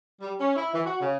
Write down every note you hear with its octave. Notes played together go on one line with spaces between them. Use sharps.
G3
C#4
E4
E3
F#4
C#3